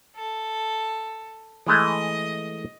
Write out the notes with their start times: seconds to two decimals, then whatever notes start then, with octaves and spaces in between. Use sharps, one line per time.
0.15 A4
1.67 E3 G#3 A3 D#5